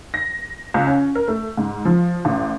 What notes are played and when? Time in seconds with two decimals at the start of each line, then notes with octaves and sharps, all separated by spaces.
0.14 A#6
0.74 C#2
0.87 C#4
1.15 A#4
1.28 A3
1.57 G#2
1.85 F3
2.25 A1